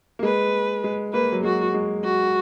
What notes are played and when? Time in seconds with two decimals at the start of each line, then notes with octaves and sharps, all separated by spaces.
0.19 A#3
0.23 G#3 B4
0.84 G#3
1.13 A#3 B4
1.32 F#3
1.44 G#3 F#4
1.74 G#3
2.05 F#4